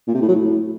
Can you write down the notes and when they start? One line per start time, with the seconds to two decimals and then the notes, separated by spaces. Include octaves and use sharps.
0.07 A#2
0.14 C3
0.21 A2
0.28 F#3
0.35 A2